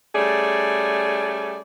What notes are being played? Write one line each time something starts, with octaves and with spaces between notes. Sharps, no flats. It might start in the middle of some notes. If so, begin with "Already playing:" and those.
G3 A3 C#4 G#4 D5